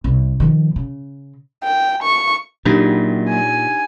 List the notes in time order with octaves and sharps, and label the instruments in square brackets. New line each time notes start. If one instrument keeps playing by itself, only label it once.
[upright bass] C2
D#3 F3
C#3
[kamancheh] G5
C#6
[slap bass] A#2 [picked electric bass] F#3 A#3 [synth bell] D4 D#4 G4
[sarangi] G#5